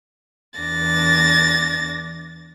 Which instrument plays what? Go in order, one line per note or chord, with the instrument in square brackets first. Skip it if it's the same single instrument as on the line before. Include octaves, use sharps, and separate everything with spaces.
[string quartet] E2 D4 A6 A#6